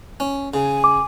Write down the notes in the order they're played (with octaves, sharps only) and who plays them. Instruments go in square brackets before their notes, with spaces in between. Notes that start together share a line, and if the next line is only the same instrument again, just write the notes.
[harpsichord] C#4
[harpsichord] C#3 [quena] G#5
[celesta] D6